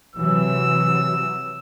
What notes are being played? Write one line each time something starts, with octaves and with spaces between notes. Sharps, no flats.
C3 E3 F#3 E6